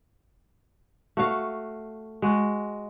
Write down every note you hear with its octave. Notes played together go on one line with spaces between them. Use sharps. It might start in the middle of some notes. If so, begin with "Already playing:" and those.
A3 F#4 F5
G#3 F#4